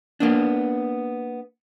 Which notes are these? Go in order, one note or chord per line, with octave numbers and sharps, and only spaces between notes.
A#3 B3 D4